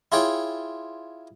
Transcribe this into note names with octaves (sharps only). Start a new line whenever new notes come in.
E4 F4 G#4 C#5 G5